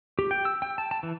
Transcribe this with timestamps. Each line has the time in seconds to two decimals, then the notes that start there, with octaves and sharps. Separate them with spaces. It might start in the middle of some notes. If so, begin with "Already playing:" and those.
0.19 G4
0.31 G5
0.45 E6
0.62 G5
0.78 A5
0.91 A5
1.03 E3